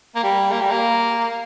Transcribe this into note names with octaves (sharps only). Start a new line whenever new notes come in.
A#3
G3
A#3
G3
A#3